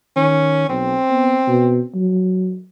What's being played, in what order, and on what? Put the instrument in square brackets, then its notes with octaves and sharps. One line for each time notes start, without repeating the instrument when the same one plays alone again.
[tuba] D#3 [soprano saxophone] C#4
[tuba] B1 [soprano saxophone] C4
[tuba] B3
B2
F#3